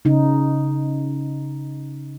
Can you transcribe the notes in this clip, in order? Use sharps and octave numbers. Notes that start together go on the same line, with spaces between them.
C#3 D#4